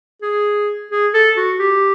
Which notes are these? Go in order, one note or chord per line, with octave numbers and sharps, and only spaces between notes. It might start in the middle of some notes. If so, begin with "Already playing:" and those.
G#4
G#4
A4
F#4
G4